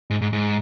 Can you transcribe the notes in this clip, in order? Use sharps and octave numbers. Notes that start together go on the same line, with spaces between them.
G#2
G#2
G#2